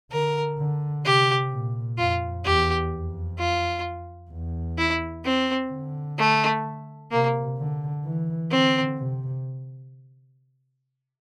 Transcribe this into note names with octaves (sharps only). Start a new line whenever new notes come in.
D3 A#4
D3
C3 G4
A#2
F2 F4
E2 G4
F2
F4
E2
E4
C4
D3
A3
C3 A#3
D3
E3
D3 C4
C3